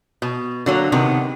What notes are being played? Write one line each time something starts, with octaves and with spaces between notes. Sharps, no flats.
B2
D3 F#3 A#3
C3 D#3 B3 D4